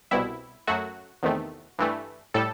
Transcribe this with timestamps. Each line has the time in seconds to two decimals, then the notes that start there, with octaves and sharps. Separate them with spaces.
0.11 C2 B2 G3 E4
0.67 F#2 F#3 A3 F#4
1.23 E2 C3 D#3 A3
1.79 G2 E3 A3
2.34 A2 G3 A4